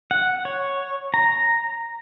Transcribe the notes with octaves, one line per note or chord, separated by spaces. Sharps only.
F#5
C#5
A#5